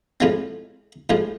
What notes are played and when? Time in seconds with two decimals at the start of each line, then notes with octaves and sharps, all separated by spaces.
0.20 A2 F3 G#3 C4
1.10 A2 F3 G#3